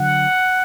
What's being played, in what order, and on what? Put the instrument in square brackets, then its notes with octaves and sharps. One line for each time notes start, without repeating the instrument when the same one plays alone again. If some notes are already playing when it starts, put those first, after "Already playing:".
Already playing: [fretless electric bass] D3 F#3 [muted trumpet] F#5